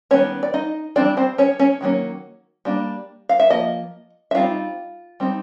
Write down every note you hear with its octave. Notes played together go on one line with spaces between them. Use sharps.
D#3 G3 B3 C#4 C#5
D5
D#4 D#5
E3 G3 C4 D4 D5
C4 C5
C#4 C#5
C#4 C#5
D#3 F#3 A#3 C#4
G3 A#3 D4
F5
E5
F3 A#3 D#5
E5
G3 C4 D#4 F4 F5
G3 C4 D#4